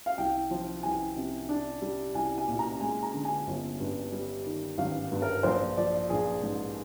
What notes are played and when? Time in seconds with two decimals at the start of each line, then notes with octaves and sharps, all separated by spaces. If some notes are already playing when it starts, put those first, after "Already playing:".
0.06 F5
0.18 C2 G5
0.51 F3
0.83 C2 G#5
1.17 C3
1.49 D4
1.82 G3
2.15 C2 G#5
2.38 G#5
2.48 A#2
2.59 A#5
2.80 G#3 G#5
3.03 A#5
3.13 D3
3.25 G#5
3.47 G1
3.80 G2
4.12 G3
4.46 D#3
4.78 G#1 F5
5.12 G2
5.22 A#4
5.43 A#1 C5
5.77 F3 D5
6.09 A#1 G#4
6.42 G#2